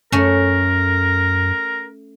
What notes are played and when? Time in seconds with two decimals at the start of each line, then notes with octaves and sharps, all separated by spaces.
0.12 F#2 A3 C#4 A#4